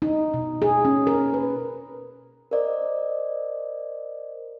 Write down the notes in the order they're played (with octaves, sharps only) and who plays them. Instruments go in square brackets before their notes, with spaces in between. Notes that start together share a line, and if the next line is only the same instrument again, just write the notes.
[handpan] D#4
B2
G#4
C#4
A#4
B4
[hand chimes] A#4 C5 D5 D#5